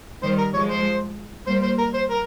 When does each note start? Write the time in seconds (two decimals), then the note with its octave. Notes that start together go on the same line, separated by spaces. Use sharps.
0.22 D#3 G3 C5
0.38 A#4
0.53 F3 G#3 C#5
0.69 C5
1.47 G3 A#3 C5
1.63 C5
1.78 A#4
1.94 C5
2.10 A#4